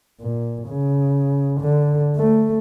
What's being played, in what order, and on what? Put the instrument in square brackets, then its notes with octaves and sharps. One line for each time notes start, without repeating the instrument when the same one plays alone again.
[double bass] A#2
C#3
D3
A3